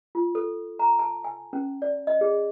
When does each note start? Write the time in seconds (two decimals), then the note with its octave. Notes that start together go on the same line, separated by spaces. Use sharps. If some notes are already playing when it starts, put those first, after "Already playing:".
0.15 F4
0.35 A4
0.79 A#5
0.99 A5
1.24 G#5
1.53 C#4
1.82 D5
2.07 D#5
2.21 G#4